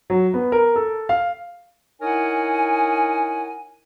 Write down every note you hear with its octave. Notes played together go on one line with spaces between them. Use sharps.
F#3
B3
A#4
A4
F5
D#4 E4 A#4 C#5 F#5 G#5